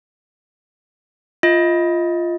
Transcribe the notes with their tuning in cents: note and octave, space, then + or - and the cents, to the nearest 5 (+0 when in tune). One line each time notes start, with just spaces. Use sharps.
F4 -10 D#5 +25